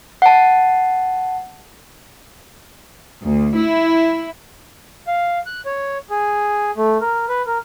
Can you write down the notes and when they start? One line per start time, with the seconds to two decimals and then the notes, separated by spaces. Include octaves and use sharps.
0.22 F#5 A5
3.22 D2
3.57 E4
5.07 F5
5.46 F#6
5.66 C#5
6.10 G#4
6.77 A3
7.01 A#4
7.29 B4
7.47 A#4